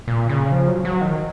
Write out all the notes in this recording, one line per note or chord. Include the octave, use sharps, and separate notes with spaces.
A#2
C#3
F3
F#3
F#3
D#3